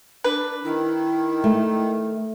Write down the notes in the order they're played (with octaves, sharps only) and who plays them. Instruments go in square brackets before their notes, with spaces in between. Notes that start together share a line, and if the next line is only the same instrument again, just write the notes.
[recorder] D4 [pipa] B4
[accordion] D#3 [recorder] E4
[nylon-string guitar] A3